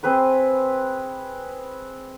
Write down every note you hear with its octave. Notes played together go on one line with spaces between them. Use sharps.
C4 G#4 B4 C#6